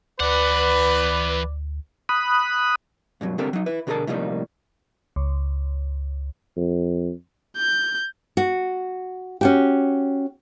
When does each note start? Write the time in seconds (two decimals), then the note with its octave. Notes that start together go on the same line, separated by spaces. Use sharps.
0.20 D2 E3 B4 D5 F#5
2.09 B5 D#6 F#6
3.21 G2 B2 F#3
3.38 C2 D3 C4 G4 A4 A#4
3.53 F#3 D#4
3.66 E4 B4
3.87 B2 D3 F#4 G#4 A#4 A5
4.07 A2 C3 F3 G3 A#3 D#4
5.16 C#2
6.56 F2
7.57 G6
8.37 F#4
9.41 C#4 F#4 G4